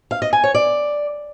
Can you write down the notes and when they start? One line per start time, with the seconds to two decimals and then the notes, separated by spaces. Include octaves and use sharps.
0.11 F5
0.22 D#5
0.33 G#5
0.44 C#5
0.54 D5